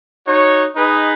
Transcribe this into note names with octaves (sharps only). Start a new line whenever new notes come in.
D#4 F#4 C#5
D#4 G#4 B4 D#5